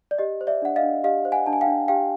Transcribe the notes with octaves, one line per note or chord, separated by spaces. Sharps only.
D5
G4 D#5
C5
D5 E5
D4 F#5
D#5 F5
D4
G4 D#5 F5
C5
F#5 G#5
D4 A5
G#5
F5 G5
D4
G4 F5 G5